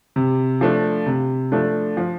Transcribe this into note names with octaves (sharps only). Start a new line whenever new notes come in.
C3
F3 A3 D4
C3
F3 A3 D4
F3